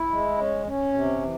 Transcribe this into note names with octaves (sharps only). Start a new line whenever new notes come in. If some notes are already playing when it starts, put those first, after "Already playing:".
Already playing: E4
G#3
C#4
C#4
C3
E3